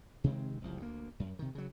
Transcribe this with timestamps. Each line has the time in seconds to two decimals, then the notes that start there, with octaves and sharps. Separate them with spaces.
0.24 C3 D#3 G#3 C4
0.62 F#1 C2 F3
0.80 D2 A#3
1.20 F#2
1.39 C3 D#3
1.55 C#3 F#3